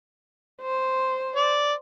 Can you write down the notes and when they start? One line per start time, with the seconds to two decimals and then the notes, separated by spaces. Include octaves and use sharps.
0.62 C5
1.36 D5